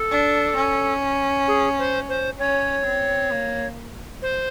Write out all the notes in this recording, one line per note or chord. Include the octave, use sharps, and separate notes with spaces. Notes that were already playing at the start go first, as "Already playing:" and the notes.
Already playing: A4
D4
C#4
G#4
C5
C5
C#4 C#5
C4
A#3
C5